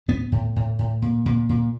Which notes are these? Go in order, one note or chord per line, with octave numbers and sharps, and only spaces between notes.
A2 B3
A2
A2
A2
A#2
A#2
A#2